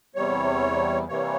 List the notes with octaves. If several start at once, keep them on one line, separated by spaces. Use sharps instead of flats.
E2 C3 G3 C#5
C3 E3 G3 A#3 C#5